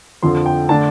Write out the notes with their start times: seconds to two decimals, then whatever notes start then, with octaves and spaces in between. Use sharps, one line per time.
0.23 F2 D3 F3 C6
0.46 G5
0.69 D3 A3 D4 A5